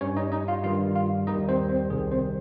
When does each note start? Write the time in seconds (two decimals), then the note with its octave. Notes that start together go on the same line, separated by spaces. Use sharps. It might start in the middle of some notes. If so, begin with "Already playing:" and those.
0.01 G2 G3 C#4 C#5
0.17 D#4 D#5
0.32 D#4 D#5
0.48 F4 F5
0.63 G2 D#3 G3 F4 F5
0.95 F4 F5
1.27 D#2 D#3 G3 D#4 D#5
1.48 C4 C5
1.69 C4 C5
1.90 C2 C3 D#3 G3 G#4
2.11 C4 C5